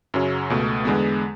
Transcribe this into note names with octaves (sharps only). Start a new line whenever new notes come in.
F#2 C#3 F#3 C#4
C#2 B2 A3
E2 D3 G#3 B3